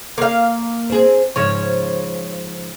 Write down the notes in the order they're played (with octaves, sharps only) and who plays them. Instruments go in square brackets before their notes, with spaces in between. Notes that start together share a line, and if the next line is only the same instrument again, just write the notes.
[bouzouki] A#3 F5
[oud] C4 G#4
[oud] G#2 C#3 F3 [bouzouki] C#5